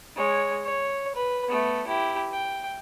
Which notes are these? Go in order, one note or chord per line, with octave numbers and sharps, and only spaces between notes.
G#3 C#5
C#5
B4
A3 B3
E4 G4
G5